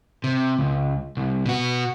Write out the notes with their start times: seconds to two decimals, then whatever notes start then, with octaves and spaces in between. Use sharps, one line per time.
0.24 C3
0.59 C#2
1.17 C2
1.46 B2 F#4